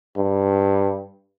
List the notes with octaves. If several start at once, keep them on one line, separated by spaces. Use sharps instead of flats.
G2